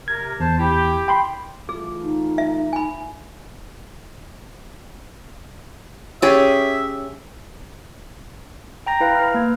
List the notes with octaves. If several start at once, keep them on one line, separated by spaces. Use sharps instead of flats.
C3 A#4 G#6
E2 C5 A5
E4 G4
G5 B5 C6
E3 A3 F4 G#4
D#4
E5
G#5 B5
C#4 G4 G#4 E5
G5 A#5 A#6
E4 B4 F5
B4 F6
A#3 G#6